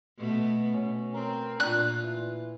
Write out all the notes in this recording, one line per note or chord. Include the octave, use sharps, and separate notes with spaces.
B2 A3 B3
B2 C#4
C4 A#4
A#2 D4 F4 F#6
E3